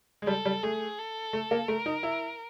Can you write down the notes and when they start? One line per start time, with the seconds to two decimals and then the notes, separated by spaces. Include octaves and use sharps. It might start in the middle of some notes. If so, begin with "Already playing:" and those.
0.22 G#3
0.27 G3 A4
0.46 G3
0.63 A3 G#4
0.98 A4
1.33 A3
1.51 A#3
1.68 A3 A#4
1.86 D#4
2.03 E4